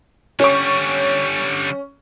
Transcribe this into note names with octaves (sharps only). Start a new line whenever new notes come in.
D3 G3 C#4 C#6